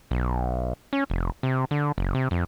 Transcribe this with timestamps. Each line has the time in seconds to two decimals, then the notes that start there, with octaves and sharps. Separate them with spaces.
0.11 B1
0.93 C#4
1.10 F1
1.43 C3
1.71 D3
1.98 F#1
2.15 C3
2.31 F2